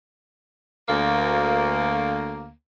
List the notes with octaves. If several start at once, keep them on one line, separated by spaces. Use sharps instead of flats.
D2 A#3